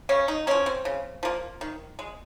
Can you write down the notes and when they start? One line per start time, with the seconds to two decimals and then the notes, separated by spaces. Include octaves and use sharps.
0.09 C#3 C#4
0.28 D#4
0.47 F3 A#3 C#4
0.66 C4
0.85 C#3
1.23 F3 A#3
1.61 D#3
1.99 G#3